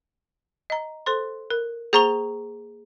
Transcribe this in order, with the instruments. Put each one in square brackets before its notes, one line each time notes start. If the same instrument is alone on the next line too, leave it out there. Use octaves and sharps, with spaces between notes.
[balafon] D#5 A#5
A4 C5 C6
A#4
[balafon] A#3 C5 C#6 [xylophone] G#4 A#5 G7